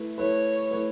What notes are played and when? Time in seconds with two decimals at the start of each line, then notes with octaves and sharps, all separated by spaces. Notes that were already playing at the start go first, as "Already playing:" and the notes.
Already playing: A3 E4 B4
0.18 A3 E4 B4 C#5
0.71 A3 E4 B4